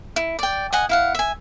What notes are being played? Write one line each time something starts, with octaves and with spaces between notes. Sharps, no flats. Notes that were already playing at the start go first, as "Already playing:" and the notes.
E4
D5 G5
D#5 F#5 G#5
E4 F5 F#5
E5 G#5